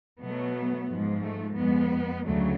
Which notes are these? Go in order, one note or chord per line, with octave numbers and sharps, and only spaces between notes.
B2 F#3 A3 B3
G#2 F3 G#3
A3
F2 F3 G#3 B3
D2 C#3 F#3 A3